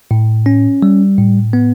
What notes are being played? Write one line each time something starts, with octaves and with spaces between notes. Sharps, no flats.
A2
C#4
G3
A2
B3